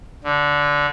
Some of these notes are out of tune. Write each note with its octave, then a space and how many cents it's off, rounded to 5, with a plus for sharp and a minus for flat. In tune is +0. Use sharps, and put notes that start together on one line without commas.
D3 -10